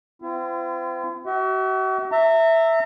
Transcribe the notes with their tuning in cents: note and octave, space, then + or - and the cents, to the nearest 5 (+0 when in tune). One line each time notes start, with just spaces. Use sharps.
C4 -35 F4 -45
F#4 +40 E5 -30
E5 +0 A#5 -35